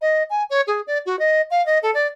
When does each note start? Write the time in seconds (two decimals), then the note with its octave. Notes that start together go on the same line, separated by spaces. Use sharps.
0.01 D#5
0.30 G#5
0.50 C#5
0.67 G#4
0.87 D5
1.06 F#4
1.19 D#5
1.51 F5
1.66 D#5
1.83 A4
1.94 D5